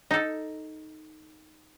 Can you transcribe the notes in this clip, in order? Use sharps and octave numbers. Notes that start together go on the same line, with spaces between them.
D#4 A4